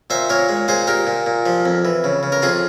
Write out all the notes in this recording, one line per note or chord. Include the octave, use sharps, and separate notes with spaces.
A#2 C5 E5
A#2 A#4 C#5
G#3
A#2 G#4 C5
A#2 G4 A#4
A#2
A#2
F3
F2
E3
C#3
C#3
A#4
F2 F4 G#4